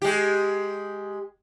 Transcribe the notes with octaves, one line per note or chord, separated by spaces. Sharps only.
G#3 G4